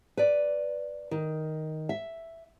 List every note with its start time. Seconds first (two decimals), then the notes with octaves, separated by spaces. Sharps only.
0.17 B4 D5
1.11 D#3
1.89 E5